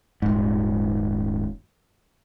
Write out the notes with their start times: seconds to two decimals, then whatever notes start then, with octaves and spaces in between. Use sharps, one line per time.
0.22 D#1 G#2